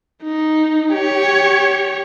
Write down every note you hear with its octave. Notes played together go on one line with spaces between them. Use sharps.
D#4
G4 C#5